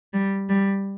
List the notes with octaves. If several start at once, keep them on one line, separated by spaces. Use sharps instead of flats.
G3
G3